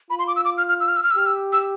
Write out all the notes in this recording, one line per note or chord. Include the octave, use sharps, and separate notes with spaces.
F4 B5
C6
D6
E6
D6
F6
F6
E6
F6
E6
F6
E6
G4 F6
E6
E6